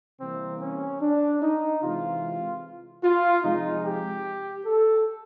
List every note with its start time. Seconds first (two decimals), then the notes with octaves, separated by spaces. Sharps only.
0.21 C3 E3 G3 A#3 C4
0.62 C#4
1.02 D4
1.42 D#4
1.83 C3 E3 G#3 F4
3.04 F4
3.44 C3 F3 G#3 D#4
3.85 G4
4.66 A4